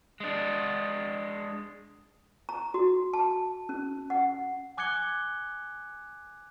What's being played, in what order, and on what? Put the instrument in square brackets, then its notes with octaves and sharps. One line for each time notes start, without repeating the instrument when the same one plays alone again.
[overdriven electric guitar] G#3 D4
[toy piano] A#5
F#4
A5
C#4
F#5
[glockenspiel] G#5 D6 F#6 G#6 C#7 G7